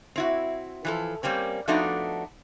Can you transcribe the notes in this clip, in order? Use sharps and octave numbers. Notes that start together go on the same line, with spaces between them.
C4 E4 F#4
E3 F3 A4
G3 A#3 C4 C#4
F3 A3 B3 D4 D#4 F#4